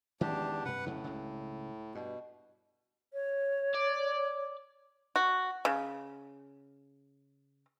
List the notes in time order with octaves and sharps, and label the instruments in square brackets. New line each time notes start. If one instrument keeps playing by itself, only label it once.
[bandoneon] E2 D4 G4 [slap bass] D#3 G#3 C#4
[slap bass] G2 C3 [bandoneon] B4 F#5
[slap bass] F2 C#3 C#4 [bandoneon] A2
[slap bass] C#2 G2 C#3
[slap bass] G2 [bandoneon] B2
[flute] C#5
[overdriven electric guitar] D5
[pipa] F#4
C#3